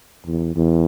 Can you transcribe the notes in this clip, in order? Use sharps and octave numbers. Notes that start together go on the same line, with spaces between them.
E2
E2